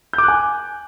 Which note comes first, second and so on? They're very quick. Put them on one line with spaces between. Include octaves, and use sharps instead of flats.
G6 D6 F#6 G#5